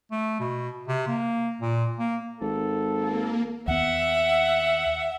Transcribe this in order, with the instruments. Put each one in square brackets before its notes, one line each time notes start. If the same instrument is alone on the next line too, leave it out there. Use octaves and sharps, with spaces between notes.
[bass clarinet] A3
B2
C3
A#3
A#2
A#3
[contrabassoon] G#1 [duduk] A4
[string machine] A#3
[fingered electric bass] D#2 B3 [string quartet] E5 [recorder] F#5